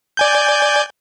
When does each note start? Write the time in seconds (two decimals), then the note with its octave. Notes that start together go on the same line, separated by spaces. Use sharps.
0.17 D5 G#5 G6